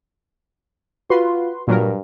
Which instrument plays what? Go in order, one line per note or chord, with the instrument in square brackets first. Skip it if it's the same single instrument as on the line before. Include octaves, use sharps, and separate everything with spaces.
[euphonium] F4 [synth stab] F#4 B4 C6
[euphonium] G2 [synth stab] A#2 F#3 A#4